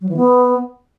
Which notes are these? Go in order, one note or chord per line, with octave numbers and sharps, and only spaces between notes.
F#3
E3
B3